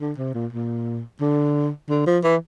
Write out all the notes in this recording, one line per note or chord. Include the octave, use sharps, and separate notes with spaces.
D3
C3
A#2
A#2
D3
D3
F3
E3